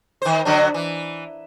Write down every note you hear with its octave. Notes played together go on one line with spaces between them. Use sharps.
D#3 C5
D3 F#3 D4
E3